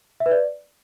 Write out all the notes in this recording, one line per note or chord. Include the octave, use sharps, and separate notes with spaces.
E5
B4
D5